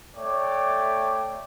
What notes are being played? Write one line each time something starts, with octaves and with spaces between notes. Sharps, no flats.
A3 C#5 D5 G5 D6